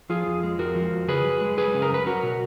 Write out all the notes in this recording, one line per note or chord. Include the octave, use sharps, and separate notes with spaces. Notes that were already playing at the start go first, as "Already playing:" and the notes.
F3 F4 G#4
F2
G#3
F2 F#4 A#4
F3
F2
C#3 G#4 B4
F#2
G#3
F#2 G#4 B4
C#3
A#4
F#2 B4
F#3 F#4 A#4
B2